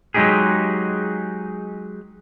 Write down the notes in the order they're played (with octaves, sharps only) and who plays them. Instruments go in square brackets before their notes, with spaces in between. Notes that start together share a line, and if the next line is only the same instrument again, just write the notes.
[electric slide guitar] F#3 G#3 C#4 D#4 G4 G#4